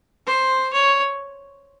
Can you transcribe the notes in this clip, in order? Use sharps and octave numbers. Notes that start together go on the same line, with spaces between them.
C5
C#5